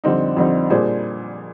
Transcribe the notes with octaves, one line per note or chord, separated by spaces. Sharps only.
F2 D3 G3 C4 D#4
F2 D3 G3 C4 D#4
A#2 G3 D4 G#4 C5